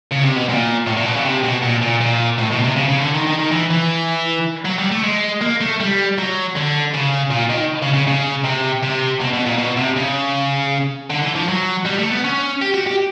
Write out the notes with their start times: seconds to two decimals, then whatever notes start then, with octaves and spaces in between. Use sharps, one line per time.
0.11 C#3
0.24 C3
0.36 B2
0.49 A#2
0.87 A2
0.97 A#2
1.06 B2
1.15 C#3
1.25 C3
1.44 B2
1.62 A#2
1.82 A#2
2.01 A#2
2.38 A2
2.51 B2
2.64 C3
2.76 C#3
2.89 C#3
3.01 D3
3.15 D#3
3.27 D#3
3.39 D#3
3.52 E3
3.71 E3
4.65 F#3
4.79 G3
4.91 A3
5.03 G#3
5.41 A#3
5.61 A3
5.80 G3
6.18 F#3
6.56 D3
6.94 C#3
7.31 A#2
7.49 D#3
7.82 C#3
7.94 C#3
8.08 C#3
8.44 C3
8.83 C3
9.21 B2
9.33 B2
9.46 A#2
9.58 B2
9.77 C3
9.97 C#3
11.10 D3
11.23 E3
11.36 F3
11.48 F#3
11.86 G3
11.99 A3
12.11 B3
12.24 C#4
12.62 G4
12.74 F#4
12.87 G4